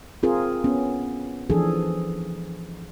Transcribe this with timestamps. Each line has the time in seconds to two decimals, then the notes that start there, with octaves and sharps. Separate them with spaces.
0.23 C4 F4 G#4 A#4
0.64 B3 C#4
1.50 E3 F3 D4 G#4 A4